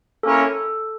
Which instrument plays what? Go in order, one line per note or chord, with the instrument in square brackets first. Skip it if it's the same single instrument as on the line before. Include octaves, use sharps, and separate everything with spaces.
[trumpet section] A#3 C#4 E4 A#4 C#5 [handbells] A4